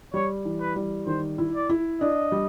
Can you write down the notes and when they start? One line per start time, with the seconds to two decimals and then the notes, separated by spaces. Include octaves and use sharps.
0.14 G3 C#5
0.45 E3
0.60 B4
0.76 G3
1.07 D#3 C5
1.38 E4
1.55 D5
1.69 E4
2.01 D4 D#5
2.32 G3